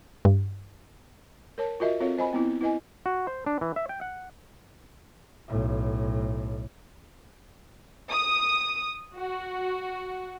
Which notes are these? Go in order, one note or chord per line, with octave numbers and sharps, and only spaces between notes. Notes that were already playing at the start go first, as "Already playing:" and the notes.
G2
A#4 C#5 A5
F4 F#4 A#4 D#5 E5
C4 F4 A4 C#5 F5
C5 D#5 G#5 B5
B3 C4 E4
E4 B4 D#5 G#5
F#4
C5
D4
E3
E5
G5
F#5
B1 A2
D#6
F#4